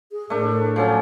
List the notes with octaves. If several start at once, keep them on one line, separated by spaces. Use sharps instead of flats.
G#4
A2 A3 D4 A#4
F3 F#3 C#4 A4